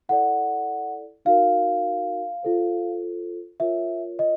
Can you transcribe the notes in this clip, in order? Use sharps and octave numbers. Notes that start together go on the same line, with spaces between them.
E4 A4 D5 F#5
D#4 F#4 A#4 F5
F4 A4 C5
F4 A#4 C#5 E5
D#5